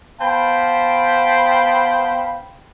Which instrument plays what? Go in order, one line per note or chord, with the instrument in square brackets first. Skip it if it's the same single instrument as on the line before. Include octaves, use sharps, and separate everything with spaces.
[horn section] B3 C5 F5 G5 A5 B5